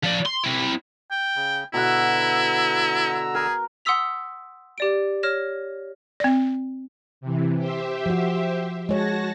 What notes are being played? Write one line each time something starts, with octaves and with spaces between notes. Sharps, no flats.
F3 D5
C6
C4 E4
G5
C#3
B2 D3 E4 F#5 A#5 E6
G#4 A#4
F#5 C6 D#6 E6 B6 F7
G4 D5 D7
C#5 F6 A#6 E7
C4 D5
C3 E3
G4 C5 E5
F3 F#4
G#3 F#4 C#5 A5 A#6